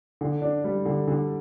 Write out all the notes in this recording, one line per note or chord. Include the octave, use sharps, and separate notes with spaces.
D3
D4
G3
D3
D3